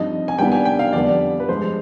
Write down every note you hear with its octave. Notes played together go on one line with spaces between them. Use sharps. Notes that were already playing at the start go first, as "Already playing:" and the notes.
Already playing: G2 F3 C4 D#4 D#5
G#5
G2 D#3 G3 B3 D4 G5
G#5
G5
F5
F2 D3 G3 B3 D5
B4
G2 F3 G#3 C5